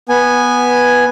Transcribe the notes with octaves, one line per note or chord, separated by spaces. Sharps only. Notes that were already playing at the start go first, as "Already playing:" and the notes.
B3 G#5